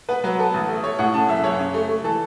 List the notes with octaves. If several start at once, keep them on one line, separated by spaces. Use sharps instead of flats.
B3 B4
F#3 B4
B3 A4
A1
A3
A3 C#5
A2 F#5
C#3 A5
F#1 E5
F#1 C#5
C#3
A3
A3
E3 A4